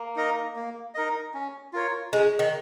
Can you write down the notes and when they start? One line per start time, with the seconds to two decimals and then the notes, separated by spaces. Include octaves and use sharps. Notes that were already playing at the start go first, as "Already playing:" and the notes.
Already playing: A#3
0.16 D#4 A#4 D#5
0.56 A#3
0.94 D#4 A#4 D#5
1.34 C#4
1.73 F4 A#4 C#5
2.13 G#3 C#4
2.39 D#3